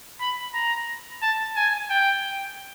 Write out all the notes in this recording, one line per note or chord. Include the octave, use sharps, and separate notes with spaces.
B5
A#5
A5
G#5
G5